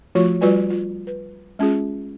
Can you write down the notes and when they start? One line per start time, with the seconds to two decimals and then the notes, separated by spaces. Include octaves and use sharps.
0.15 F3 A3 F4 F#4 C#5 C#6
0.41 G3 F4 F#4 B4 D5 G#5
0.70 F4
1.07 B4
1.59 G#3 C#4 F4 G#4